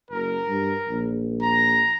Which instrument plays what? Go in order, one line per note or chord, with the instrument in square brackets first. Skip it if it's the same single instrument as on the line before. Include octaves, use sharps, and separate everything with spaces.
[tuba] F#1 [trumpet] A#4
[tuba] G2
A#1
[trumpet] A#5